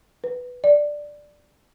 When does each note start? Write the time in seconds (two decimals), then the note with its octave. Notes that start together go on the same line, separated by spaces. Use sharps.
0.24 B4
0.64 D5